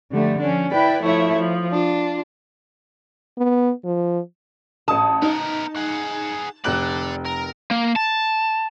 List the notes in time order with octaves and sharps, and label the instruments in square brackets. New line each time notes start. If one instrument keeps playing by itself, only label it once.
[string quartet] D3 F3 G3 A3
F3 C#4 D4
E4 B4 D5 G5 B5
F3 A3 E4 C#5 E5
F3
D4 F4
[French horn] B3
F3
[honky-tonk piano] A1 D#6 [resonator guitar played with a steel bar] A5
[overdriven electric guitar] B3 A#4 [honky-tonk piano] D#4
[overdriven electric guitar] G#4 F#5
[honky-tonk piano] F1 F#6 F#7 [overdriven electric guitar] A4 D5
[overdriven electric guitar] A#4
A#3
A5